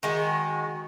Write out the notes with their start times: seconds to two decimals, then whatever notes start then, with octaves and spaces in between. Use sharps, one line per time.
0.03 D#3 G#3 F#4